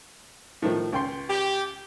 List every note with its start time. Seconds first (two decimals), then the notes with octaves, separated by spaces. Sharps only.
0.62 A2 D#3 F3
0.93 C#2 G5 C6
1.29 G4